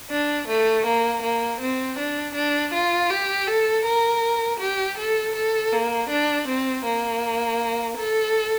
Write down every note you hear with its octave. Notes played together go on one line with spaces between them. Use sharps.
D4
A3
A#3
A#3
C4
D4
D4
F4
G4
A4
A#4
G4
A4
A4
A#3
D4
C4
A#3
A4